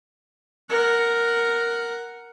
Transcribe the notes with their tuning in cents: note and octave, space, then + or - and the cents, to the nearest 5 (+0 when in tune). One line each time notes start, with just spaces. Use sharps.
A#4 +0 F#5 +0